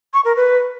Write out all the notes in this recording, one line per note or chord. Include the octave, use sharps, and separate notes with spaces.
C#6
A#4
B4